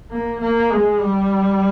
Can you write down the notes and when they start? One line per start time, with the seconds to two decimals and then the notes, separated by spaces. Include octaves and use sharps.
0.11 A#3
0.41 A#3
0.70 G#3
1.00 G3